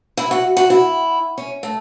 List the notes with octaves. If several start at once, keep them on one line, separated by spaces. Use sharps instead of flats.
E4
F#4
F#4
E4
C#4
A3